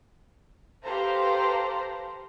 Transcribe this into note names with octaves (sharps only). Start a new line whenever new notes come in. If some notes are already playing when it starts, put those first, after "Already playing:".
G4 A4 B4 C5 F5 A#5